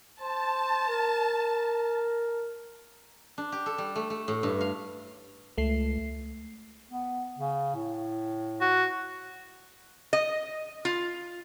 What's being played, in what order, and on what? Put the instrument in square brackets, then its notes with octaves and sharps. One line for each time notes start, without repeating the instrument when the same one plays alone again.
[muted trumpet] C5 [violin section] A5
[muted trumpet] A#4
[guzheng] D4
G4
A4
G3
A3
A3
A2
G2
F5
[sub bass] C#2 [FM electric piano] A3 C7
[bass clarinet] B3
C#3
A2
[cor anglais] F#4
[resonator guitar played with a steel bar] D#5
F4